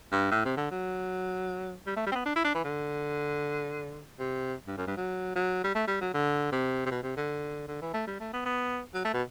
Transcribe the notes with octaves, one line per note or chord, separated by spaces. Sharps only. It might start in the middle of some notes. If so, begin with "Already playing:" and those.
G2
A2
C3
D3
F#3
G3
A3
G3
C4
B3
D4
E4
D4
E3
D3
C3
G2
F#2
G2
F#3
F#3
G3
A3
G3
F#3
D3
C3
C3
B2
C3
D3
D3
E3
A3
G3
A3
B3
B3
F#3
A3
B2